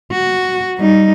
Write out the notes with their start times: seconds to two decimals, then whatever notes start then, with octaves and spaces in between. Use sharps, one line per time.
0.11 F#4
0.78 G3 D#4